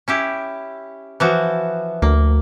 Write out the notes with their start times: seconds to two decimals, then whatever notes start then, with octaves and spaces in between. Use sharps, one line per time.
0.08 C#4 E4 G4
1.20 E3 F3 F#4
2.02 D2 A#3